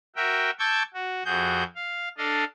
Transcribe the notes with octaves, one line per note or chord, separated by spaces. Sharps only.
F#4 A#4 E5 G5
A5 C#6 D6 E6 G6 G#6
F#4
F2 F#4 G#4 G6
F5
D4 A4 D#5 F5